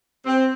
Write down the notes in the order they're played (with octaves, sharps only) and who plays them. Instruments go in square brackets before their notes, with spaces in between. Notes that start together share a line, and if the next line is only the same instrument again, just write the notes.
[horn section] C4